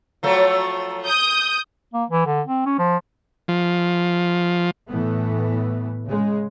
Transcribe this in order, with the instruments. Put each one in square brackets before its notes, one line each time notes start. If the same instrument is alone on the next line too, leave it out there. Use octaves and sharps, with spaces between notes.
[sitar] F3 F#3 A3
[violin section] D#6 G6
[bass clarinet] A#3
E3
D3
C4
C#4
F3
[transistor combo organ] F3
[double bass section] A2 E3 A3 B3
C#3 G#3